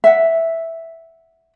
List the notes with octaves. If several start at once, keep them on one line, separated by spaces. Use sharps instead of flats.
E5 F#5